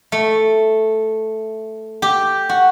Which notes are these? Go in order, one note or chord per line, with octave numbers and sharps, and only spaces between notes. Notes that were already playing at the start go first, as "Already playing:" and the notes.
A3
G4
F#4